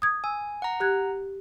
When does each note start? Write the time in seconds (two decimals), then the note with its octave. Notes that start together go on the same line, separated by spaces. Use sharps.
0.02 D#6 G#6
0.24 G#5 E6
0.62 F#5 A#5
0.80 G4 F#6 G#6